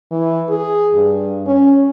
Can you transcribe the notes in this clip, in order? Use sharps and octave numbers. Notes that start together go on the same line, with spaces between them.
E3
G#4
G2
C#4